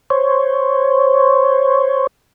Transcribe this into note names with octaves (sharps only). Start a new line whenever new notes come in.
C5 C#5